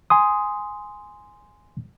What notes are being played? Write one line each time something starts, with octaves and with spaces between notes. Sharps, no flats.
G#5 C6 D#6